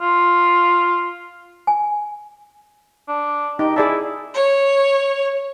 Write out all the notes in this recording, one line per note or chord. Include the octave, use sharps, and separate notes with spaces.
F4
G#5
D4
D#4 G4
E4 G#4 D5 A5
C#5